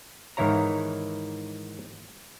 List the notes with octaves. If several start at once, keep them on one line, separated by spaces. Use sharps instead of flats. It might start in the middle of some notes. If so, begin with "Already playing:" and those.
G#2 D#3 E3 E4 C#5 A#5